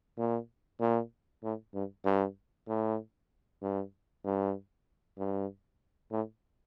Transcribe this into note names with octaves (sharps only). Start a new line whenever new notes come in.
A#2
A#2
A2
G2
G2
A2
G2
G2
G2
A2